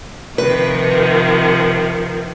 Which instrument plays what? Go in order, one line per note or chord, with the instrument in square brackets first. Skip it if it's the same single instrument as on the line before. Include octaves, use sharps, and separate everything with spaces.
[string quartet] C3 D#3 F3 [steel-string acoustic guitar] B4